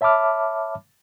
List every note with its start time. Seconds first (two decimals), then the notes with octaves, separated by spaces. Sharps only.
0.01 C#5 E5 A5 B5 D6 F6